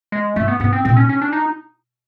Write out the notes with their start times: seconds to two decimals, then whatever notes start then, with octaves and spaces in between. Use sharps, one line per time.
0.12 G#3
0.36 G2 A3
0.48 B3
0.60 G#2 B3
0.73 C4
0.85 A#2 C4
0.97 C#4
1.09 C#4
1.22 D4
1.33 D#4